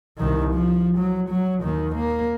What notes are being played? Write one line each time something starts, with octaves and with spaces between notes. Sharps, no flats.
C2 D#3
F3
F#3
F#3
D#2 D#3
A#3